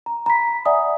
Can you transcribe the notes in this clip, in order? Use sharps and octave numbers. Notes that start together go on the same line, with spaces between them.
A#5
A#5 B5 B6
D5 E5 F#5 G#5 A#5 D#6